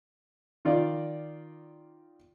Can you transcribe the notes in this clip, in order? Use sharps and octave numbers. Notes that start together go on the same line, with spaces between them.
D#3 F4 D5